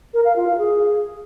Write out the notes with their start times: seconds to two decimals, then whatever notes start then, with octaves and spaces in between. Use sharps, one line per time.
0.14 A#4
0.25 F5
0.36 F4
0.47 F5
0.58 G#4